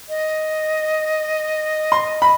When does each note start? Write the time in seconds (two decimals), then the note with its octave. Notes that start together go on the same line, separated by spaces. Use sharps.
0.09 D#5
1.92 C6
2.22 B5